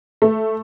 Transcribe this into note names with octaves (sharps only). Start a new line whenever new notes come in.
A3